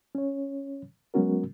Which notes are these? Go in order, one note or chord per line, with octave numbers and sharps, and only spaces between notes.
C#4 C#5
F#3 G#3 B3 C#4 F#4 A#4